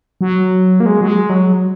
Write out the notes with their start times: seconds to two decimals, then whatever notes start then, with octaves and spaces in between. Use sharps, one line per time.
0.21 F#3
0.80 A#3
0.86 G#3
1.01 F#3
1.08 G#3
1.30 F#3